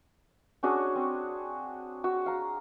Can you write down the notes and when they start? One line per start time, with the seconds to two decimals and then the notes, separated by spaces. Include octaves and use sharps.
0.63 C#4 D4 F#4 G#4
0.95 C4
2.04 F#4 E6
2.26 F5 A#5